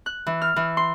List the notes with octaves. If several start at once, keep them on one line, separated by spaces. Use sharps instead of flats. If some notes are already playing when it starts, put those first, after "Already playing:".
F#6
E3
F6
E3
C6